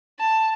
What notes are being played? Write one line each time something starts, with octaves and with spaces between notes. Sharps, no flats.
A5